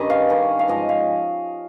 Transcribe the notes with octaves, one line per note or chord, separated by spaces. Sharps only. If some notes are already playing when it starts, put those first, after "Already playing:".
Already playing: G2 D#3 G3 C#4 D#5
F5
G2 D#3 G3 C#4
F5
G#2 F3 G#3 D#5
F5